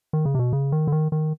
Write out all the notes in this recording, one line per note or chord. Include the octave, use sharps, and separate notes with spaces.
D#3
C#3
C3
B2
C#3
D#3
D3
D#3
D#3